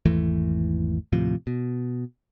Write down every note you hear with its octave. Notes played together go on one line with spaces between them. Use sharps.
G#1 E2 E3 A3
D#2 A2 C3 F3
B2